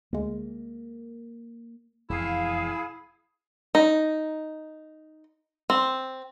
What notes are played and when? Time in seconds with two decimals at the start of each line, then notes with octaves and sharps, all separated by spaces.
0.13 D2 G#3 A#3
2.09 E1 F2 E4 G#4 F5
3.75 D#4
5.70 C4